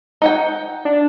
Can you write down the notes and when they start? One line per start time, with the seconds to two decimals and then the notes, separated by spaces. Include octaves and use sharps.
0.22 D#4 F#5 G5
0.85 D4